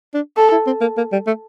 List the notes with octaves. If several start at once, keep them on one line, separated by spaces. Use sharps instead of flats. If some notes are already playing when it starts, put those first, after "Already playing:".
D4
A4
E4
C4
A#3
A#3
G3
A3